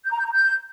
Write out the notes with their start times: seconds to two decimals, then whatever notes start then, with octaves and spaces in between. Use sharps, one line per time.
0.04 G6
0.11 A#5
0.18 G6
0.25 A#5
0.32 G6